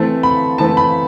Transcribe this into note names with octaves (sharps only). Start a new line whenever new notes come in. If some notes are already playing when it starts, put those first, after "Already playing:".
Already playing: E3 A3 C4 A5
B5
E3 A3 C4 A5
B5